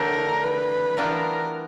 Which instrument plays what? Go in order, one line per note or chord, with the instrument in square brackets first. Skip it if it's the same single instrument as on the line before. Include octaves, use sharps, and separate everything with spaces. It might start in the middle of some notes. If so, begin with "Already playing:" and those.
Already playing: [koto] D3 F#3 A3 D4 G4 [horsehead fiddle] A#4
[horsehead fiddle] B4
[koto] E3 G3 B3 D4 F4 [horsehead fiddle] A#4